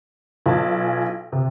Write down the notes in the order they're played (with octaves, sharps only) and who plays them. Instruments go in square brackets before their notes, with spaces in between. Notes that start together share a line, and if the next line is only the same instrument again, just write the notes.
[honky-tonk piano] B1 A5 [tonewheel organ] F4 G#5
[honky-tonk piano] C3